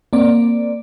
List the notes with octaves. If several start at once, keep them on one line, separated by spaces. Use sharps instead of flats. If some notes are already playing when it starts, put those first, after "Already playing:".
A#3 C4 D5